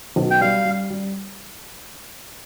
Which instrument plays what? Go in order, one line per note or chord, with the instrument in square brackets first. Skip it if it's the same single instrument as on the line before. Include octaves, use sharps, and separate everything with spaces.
[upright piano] B1
[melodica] G5
[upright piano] G3 [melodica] F5
[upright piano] G3
G3